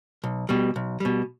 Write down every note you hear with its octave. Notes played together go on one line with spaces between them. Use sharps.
B1
B2 G3
B1
B2 G3